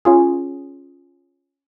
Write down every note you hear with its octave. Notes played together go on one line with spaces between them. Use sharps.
C#4 F4 G#4